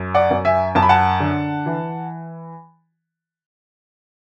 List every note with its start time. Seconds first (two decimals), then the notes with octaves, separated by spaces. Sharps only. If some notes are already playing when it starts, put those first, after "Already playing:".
Already playing: F#2
0.14 D5 F#5
0.31 F#2
0.45 E5 G#5
0.75 F#2 A5
0.82 B5
0.89 F#5 A5
1.20 D3
1.66 E3